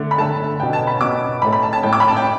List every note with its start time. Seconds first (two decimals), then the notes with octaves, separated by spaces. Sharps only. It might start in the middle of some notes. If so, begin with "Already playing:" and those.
Already playing: D3 A3
0.11 B5
0.18 D3 A3 A5
0.59 B3 G5
0.63 B2
0.73 A5
0.87 B5
1.01 B2 B3 D6
1.42 A2 A3 B5
1.53 B5
1.62 A5
1.73 A5
1.83 A2 A3 G5
1.93 D6
2.00 B5
2.08 A5
2.17 G5